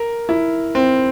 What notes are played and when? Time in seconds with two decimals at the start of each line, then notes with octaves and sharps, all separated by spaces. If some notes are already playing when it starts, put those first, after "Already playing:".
Already playing: A#4
0.29 E4
0.75 C4